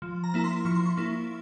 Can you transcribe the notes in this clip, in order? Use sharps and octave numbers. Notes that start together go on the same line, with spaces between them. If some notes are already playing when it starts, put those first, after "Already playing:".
F3
A#5
A#3 E4 A#5
C6
F3 C#6
C6
C#6
A#3 E4